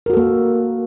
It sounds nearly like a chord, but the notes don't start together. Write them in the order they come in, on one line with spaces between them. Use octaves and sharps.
A#4 F#4 A4 A#3